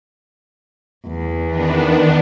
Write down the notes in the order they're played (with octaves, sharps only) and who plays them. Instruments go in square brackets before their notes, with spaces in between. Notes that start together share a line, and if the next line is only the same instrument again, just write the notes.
[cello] E2
[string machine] D#3 B3 D4